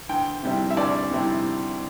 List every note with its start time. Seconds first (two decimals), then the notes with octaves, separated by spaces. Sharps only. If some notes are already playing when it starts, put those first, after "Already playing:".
0.09 D2 G5
0.43 C3 G3 C4 E4
0.70 E5
0.77 D2 D5
1.11 C3 G3 C4 E4